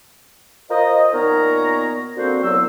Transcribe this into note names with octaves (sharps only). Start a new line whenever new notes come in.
F4 A#4 C5 D#5
A#2 D#3 B3 A#4 C#5 A#5
D3 A#3 C4 F#4 C5
C2 A#2 F#3 B3 E6